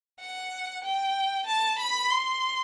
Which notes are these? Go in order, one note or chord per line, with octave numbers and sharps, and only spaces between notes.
F#5
G5
A5
B5
C6